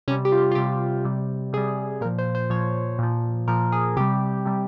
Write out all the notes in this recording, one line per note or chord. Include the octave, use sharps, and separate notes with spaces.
C3 G3 C#4
G4
F4
F4
C3 G3 G4
C3 G3
C3 G3 G#4
A#2 F3 A#4
C5
C5
A#2 F3 C#5
A#2 F3
A#2 F3 A#4
G#4
C3 G3 G4
C3 G3